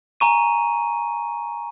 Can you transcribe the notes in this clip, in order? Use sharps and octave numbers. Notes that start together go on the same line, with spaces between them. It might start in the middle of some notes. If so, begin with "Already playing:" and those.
G#5 A#5 C#6 D#7